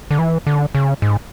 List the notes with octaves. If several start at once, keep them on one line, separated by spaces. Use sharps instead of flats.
D3
E3
D3
C#3
G#2